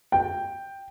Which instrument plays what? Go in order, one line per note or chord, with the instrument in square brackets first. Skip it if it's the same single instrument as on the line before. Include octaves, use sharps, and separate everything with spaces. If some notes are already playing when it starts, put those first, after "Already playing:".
[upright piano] G5